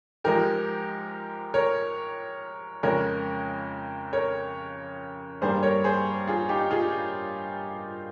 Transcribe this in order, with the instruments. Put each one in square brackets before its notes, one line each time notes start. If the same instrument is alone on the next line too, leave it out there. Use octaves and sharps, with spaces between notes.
[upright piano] G#2 F3 G#3 G4 A#4
A#4 C#5
F2 C#3 G#3 A#4 C#5
A#4 C#5
G2 G3 A#3 G#4 C5
A#4 C#5
G#4 C5
F4 G#4
D#4 G4
F4 G#4